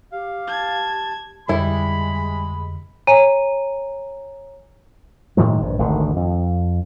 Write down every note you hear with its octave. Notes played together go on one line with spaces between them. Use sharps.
G4 F5
A5 G#6
F2 D3 G3 G#3 E4 B5
C#5 G#5 A#5 D#7
A2 D#3 F3 G#3
A#1 G2
G#1 D2 D3 D#3
F2